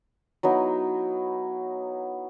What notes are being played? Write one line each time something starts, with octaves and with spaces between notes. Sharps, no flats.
F#3 B3 D#4 E4